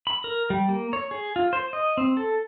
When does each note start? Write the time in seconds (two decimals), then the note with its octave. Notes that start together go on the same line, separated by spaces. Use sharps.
0.07 B5
0.24 A#4
0.50 G3
0.69 A#3
0.93 C#5
1.11 G#4
1.36 F4
1.53 C5
1.73 D#5
1.97 C4
2.17 A4